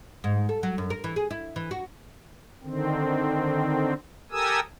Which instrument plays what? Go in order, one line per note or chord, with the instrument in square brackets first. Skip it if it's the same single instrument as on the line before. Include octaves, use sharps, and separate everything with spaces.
[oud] G#2
A4
F#3
F#2
A#4
E3
G#4
E4
E3
F#4
[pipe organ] D3 D#3 C4
G4 A4 A#4 G#5 D#6 E6